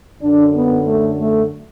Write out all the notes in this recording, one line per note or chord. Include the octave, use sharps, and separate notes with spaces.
F#2 D3 D4
B3
A3
A3